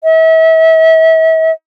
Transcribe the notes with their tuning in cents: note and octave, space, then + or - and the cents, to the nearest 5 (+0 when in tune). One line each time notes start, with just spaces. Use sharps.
E5 -35